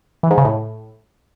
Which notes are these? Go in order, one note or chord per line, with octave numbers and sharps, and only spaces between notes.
E3
G#2
C#3
A2